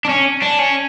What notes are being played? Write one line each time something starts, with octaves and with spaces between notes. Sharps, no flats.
D4
C#4
D4
C#4